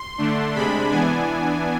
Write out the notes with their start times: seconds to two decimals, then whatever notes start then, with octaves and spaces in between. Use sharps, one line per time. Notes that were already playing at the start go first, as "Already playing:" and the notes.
Already playing: C6
0.18 D3 A3 D4
0.54 C3 G#3 D4 B5
0.89 E3 B3 D4 G#5